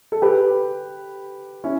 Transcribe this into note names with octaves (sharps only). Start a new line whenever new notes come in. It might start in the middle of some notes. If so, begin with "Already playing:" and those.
A4
G4 B4
C#4 E4